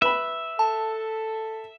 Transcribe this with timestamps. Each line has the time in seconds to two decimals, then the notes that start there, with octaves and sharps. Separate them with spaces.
0.02 B4 E5 B5
0.59 A4 A5